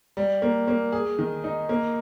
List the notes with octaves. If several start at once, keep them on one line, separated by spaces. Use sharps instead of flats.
G3
A#3
A#3
G#4
D#3
D#4
A#3